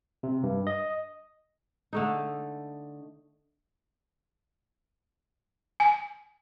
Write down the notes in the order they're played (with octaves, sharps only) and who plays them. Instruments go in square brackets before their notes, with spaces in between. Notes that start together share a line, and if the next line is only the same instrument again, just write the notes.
[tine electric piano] C3
G2
D#5
[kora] D3 A3 D#4
[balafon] G#5